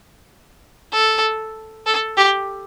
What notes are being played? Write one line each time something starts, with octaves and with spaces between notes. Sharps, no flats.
A4
A4
G4